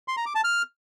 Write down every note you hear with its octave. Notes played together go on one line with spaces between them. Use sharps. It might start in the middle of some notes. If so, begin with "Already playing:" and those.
C6
A#5
D6
A5
F6